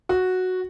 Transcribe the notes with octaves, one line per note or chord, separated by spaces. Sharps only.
F#4